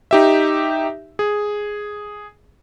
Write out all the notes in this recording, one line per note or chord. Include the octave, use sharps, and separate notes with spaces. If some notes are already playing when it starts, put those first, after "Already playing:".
D#4 G4 E5
G#4